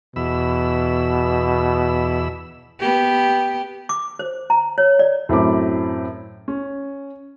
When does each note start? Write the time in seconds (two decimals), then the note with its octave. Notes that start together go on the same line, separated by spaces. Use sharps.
0.16 E2 B2 B5 E6
2.79 B3 G4
3.89 D6
4.19 C5
4.50 A#5
4.78 C#5
4.99 D5
5.29 F#2 A2 C4 B5 D6
6.48 C#4